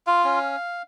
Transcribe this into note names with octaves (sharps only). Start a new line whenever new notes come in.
F4 F5
C#4